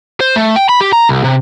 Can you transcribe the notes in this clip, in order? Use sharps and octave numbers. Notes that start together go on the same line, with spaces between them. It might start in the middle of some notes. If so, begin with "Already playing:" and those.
C5
A3
G5
B5
G4
A#5
C2
C3